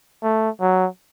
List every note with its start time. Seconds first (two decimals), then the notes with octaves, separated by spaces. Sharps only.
0.23 A3
0.61 F#3